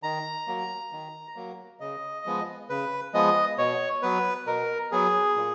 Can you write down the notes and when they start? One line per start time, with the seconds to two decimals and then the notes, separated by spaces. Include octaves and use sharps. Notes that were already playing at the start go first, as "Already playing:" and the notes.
0.03 D#3 A#5
0.47 F#3 A#3
0.92 D#3
1.36 F#3 A#3
1.80 C#3 D#5
2.26 F3 G#3 B3
2.69 C#3 B4
3.14 F3 G#3 B3 D#5
3.58 B2 C#5
4.02 F#3 B3 B4
4.47 B2 A#4
4.92 F#3 B3 G#4
5.36 A#2